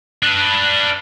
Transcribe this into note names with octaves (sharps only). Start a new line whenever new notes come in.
D4 B4